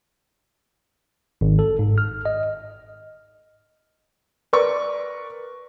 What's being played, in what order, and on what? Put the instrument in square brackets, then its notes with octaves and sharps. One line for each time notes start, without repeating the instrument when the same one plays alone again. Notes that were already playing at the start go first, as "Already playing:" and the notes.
[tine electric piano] G#1
A4
G#2
F6
D#5
[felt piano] A#4 B4 D5 C#6